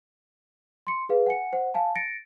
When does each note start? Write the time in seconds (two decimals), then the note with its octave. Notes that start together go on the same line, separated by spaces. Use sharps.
0.87 C6 C#7
1.09 G#4 B4 F5
1.26 F#5 G#5 C#7
1.53 C5 F#5
1.74 F5 G#5 A5
1.95 A6 A#6 C#7 D7